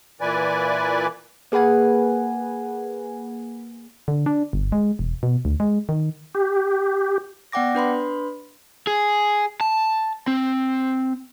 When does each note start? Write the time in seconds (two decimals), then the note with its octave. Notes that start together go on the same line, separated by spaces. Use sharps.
0.21 A#2 E3 B4 D5 G#5
1.52 A#3 G#4 B4 F#5 G#5
4.08 D3
4.26 D4
4.53 G1
4.72 G#3
4.99 E1
5.23 B2
5.45 D2
5.60 G#3
5.89 D#3
6.35 G4
7.52 B3 D5 F#5 G5 D6 A#6
7.75 D4 B4 B5 C6
8.87 G#4
9.61 A5
10.28 C4